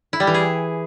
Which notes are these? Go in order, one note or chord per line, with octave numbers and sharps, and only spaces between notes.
E4
G3
E3
G#4